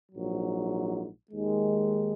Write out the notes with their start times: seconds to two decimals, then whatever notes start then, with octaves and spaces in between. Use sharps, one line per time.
0.12 A#1 G#2 F#3
1.31 D#2 D#3 G#3